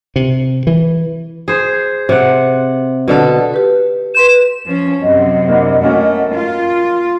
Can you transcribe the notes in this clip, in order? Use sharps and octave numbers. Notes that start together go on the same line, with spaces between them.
C3
E3
G#4 C5
C3 F#5
B2 D3 A4
G4 B4
B4 C6 G6 E7
F3 C#4
F#2 C3 D#5 F#5
A#3 D4 E4
A3 A#3 C#4 F#4
F4